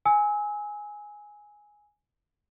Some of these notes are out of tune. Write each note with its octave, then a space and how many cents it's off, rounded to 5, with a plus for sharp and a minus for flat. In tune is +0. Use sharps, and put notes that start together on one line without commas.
G#5 +0 E6 -35